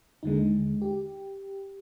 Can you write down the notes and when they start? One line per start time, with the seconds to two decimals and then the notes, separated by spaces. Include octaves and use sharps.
0.23 D#2 D3 G#3 D#4
0.82 G4